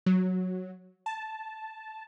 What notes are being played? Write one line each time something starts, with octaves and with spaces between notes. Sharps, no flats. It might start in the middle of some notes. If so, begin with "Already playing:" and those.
F#3
A5